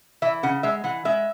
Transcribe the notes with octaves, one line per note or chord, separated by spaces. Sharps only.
E3 E5
C#3 F#5
G#3 E5
E3 F#5
G#3 E5